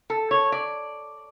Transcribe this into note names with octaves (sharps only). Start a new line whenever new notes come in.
A4
C#5
D5